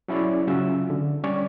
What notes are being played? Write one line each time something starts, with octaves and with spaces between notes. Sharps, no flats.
F#3 C#4 E4 G#4 C#5 D5
C#3 F#3 C#4 F4 E5 E6
D3
G3 C#4 C#5 D5